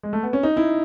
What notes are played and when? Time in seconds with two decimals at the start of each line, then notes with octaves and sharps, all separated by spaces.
0.03 G#3
0.13 A3
0.23 B3
0.33 C#4
0.43 D#4
0.57 E4